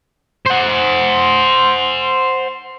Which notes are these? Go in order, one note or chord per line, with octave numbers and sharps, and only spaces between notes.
C5 F#5